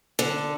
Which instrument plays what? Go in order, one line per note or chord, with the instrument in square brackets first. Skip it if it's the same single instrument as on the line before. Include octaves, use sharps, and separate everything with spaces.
[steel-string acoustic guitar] D3